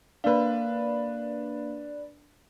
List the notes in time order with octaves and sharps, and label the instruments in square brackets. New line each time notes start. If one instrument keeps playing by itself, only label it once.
[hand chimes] A#3 F5 [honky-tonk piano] D4 B4